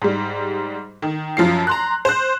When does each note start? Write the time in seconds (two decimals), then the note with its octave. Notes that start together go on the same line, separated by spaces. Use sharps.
0.02 G#2 G3
1.02 D#3
1.37 F#2 F3 F4 C7
1.67 A#5 C6 F#6
2.05 C5 F#6